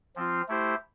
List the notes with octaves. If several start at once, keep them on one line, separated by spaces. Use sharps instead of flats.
F3 C4 F4
A3 E4 G4 C5